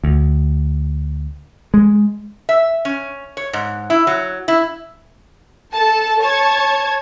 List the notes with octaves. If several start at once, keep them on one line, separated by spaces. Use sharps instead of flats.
D2
G#3
E5
C#4
C#5
G#2
E4
F#3
E4
A4 A5
C#5 A5 G#6